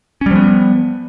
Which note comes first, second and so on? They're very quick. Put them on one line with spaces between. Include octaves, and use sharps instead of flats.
C#4 G3 F3 B3